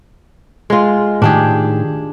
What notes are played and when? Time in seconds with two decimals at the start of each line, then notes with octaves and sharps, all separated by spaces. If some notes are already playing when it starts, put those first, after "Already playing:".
0.70 G#3 F4
1.22 A2 D#3 D4 G4 G#4